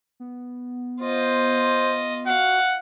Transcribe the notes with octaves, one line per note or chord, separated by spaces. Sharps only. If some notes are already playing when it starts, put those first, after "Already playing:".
B3
F4 C5 D#5
F#4 F5 F#5